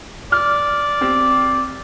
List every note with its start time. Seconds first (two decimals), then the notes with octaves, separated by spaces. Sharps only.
0.32 D5 F6
1.01 C4 G4